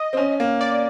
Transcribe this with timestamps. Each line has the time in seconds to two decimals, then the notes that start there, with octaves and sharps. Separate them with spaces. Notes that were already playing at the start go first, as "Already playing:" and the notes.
Already playing: D#5
0.13 C4
0.17 C#4
0.40 A#3
0.61 D5